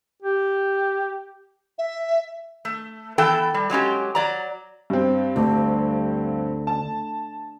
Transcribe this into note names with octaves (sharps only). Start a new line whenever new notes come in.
G4
E5
A3
E3 B3 A4 G5
G3
F#3 G#3 C#4 G4
F#3 D5 A#5
G2 C4
D2
A5